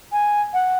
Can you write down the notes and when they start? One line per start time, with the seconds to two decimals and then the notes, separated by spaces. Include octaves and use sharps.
0.12 G#5
0.54 F#5